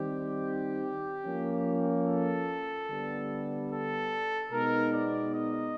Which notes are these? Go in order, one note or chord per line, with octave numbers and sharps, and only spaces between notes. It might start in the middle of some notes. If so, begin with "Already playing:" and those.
Already playing: D#3 G3 C4 D#4 G4
F3 A#3 C#4
A4
D3 G3 B3
A4
B2 G#3 B3 D#4 A#4
D5
D#5